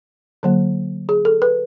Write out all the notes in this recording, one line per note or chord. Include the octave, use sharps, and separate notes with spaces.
D3 F#3 A#3
G#4
A4
B4